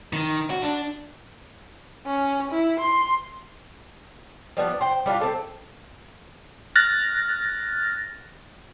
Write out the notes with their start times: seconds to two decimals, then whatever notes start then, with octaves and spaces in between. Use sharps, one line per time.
0.13 D#3
0.50 F#4
0.62 D4
2.06 C#4
2.51 E4
2.80 C6
4.57 F3 G3 B3 D4
4.81 C5 G5
5.06 G3 D4 F4 G4
5.21 C4 A4
6.75 F6 F#6 A6 A#6